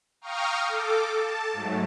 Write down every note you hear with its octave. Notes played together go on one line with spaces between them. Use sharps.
F5 G5 A#5 C#6 D#6 F6
A4 D6
A5
G#2 F#3 A3